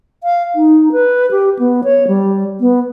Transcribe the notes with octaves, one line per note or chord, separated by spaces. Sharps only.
F5
D#4
B4
G4
B3
C#5
G3
B3